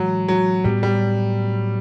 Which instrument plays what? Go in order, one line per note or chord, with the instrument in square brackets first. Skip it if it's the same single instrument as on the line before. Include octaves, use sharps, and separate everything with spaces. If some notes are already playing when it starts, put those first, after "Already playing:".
Already playing: [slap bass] A2 E3 G#3 [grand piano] F#3
[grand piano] F#3
[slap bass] A2 F#3 B3 [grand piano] G3
[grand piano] G3